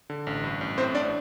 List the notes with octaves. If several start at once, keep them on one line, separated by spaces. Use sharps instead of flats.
D3
A1
G2
A1
A2 C4 C5
A1 D4 D5